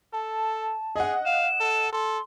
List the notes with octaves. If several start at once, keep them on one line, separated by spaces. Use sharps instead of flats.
A4 A5
G#4 D#5 F#5
F5 E7
A4
A4 C6